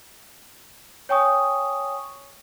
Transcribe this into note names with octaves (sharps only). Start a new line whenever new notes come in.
C#5 G5 G#5 C#6 D#6